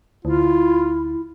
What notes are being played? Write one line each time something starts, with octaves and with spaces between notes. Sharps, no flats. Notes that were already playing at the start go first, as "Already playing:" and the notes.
D2 E4 F4